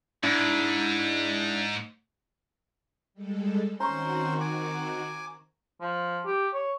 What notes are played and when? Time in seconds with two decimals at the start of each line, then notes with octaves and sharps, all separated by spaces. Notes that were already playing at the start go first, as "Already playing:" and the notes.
0.24 G#2 D4 E4
3.14 G3 G#3 A4
3.80 D#3 C4 C#4 F#4 C5 A#5 C6 C#6
4.41 G#5 D6
5.81 F3
6.26 G4
6.54 C#5